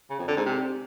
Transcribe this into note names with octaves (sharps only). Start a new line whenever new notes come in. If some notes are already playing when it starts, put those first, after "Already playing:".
C#3
F2
D3
G#2
C3